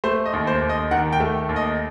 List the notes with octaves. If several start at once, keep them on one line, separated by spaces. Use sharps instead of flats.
A3 C5
D#5
D#2
C5
D#2
D#5
D#3 F#5
G5
A3
D#2
D#5